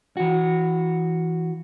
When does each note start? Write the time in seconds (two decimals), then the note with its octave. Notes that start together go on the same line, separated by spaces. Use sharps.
0.17 E3 F#4